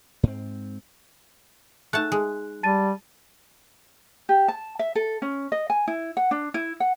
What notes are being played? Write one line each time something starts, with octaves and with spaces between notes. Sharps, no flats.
G#2 C4
A3 D#4 F#5 A5 F#6
G#3
G3 A5 A6 D#7
G4
A5
E5
A4
C#4
D#5
G#5
E4
F#5
D4
E4
F#5